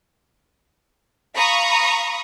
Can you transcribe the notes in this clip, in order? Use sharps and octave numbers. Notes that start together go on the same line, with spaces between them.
F5 A#5 B5 C#6 D#6